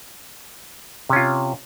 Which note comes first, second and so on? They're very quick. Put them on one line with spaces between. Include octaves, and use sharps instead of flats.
C3 C#4 F4